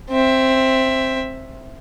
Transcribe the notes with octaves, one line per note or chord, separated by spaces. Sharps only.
C4 E5